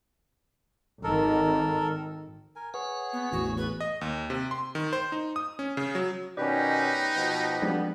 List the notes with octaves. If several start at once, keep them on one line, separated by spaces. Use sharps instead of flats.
G#1 D#3 A4 A#4
A#4 G#5
G#4 B4 C#5 F#5
B3
A1 E2 F#4
G#4 B4
D#5
D#2
C3
C6
D#3
C5
D#4
D#6
C#4
C#3
F#3
B2 D#3 C#4 D#4 G4 B4 D5
B2 F3 G6
F2 F3 G3 G#3 B3 D4